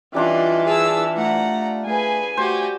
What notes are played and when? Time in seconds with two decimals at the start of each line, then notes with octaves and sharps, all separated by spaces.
0.14 E3 G3 C#4 D4 F4 D5 D#5
0.66 G#4 A5 E6
1.17 A3 F#5 A#5
1.86 A3 G#4 B4 G#5
2.37 A3 F#4 G4 C5